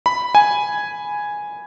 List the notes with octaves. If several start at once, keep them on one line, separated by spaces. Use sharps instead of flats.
B5
G#5